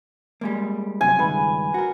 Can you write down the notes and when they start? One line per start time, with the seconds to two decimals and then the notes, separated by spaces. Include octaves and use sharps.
0.41 G3 G#3 A#3
1.01 F#2 C3 G#5
1.19 C#2 G2 D#3 B4
1.74 F#4 A#4